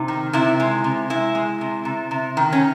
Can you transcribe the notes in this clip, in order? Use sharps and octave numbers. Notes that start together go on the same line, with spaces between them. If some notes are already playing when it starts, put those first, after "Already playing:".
Already playing: C3 D#4
D#3
C3 E4
G#3
C3
G#3 E4
G#3
C3
C3
C3
D#3
C#4